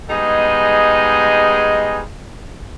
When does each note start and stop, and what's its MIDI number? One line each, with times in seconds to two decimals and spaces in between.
0.10 2.02 55
0.10 2.02 56
0.10 2.02 59
0.10 2.02 63
0.10 2.02 68
0.10 2.02 75